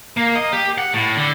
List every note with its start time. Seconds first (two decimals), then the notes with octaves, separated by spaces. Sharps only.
0.17 A#3
0.35 D#5
0.53 G4
0.78 F#5
0.93 A2
1.17 D3